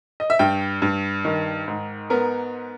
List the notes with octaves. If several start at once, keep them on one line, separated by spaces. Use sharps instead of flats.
D#5
E5
G2 G5
G2
D#3
G#2
B3 A#4